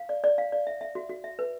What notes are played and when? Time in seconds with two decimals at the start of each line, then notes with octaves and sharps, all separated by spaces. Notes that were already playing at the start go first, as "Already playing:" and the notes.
Already playing: F5
0.09 D5
0.24 D5
0.38 F5
0.52 D5
0.67 E5
0.81 E5
0.95 F#4
1.09 F#4
1.24 E5
1.39 B4